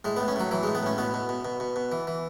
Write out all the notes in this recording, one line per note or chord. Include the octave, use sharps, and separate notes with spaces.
A2 G#3
A2 B3
C#4
A2 F#3
E3 F#3
A2 G#3
B3
A2 C#4
B2 B3
B2
B2
B2
B2
B2
E3
E3